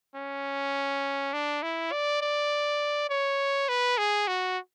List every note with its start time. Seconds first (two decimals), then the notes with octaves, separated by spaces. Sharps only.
0.16 C#4
1.33 D4
1.62 E4
1.92 D5
2.21 D5
3.10 C#5
3.69 B4
3.98 G#4
4.27 F#4